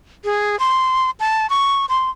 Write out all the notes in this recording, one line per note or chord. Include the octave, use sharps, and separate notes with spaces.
G#4
C6
A5
C#6
C6